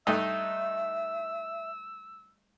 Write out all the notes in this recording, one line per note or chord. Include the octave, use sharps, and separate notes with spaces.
G2 A3 D#4 E5 E6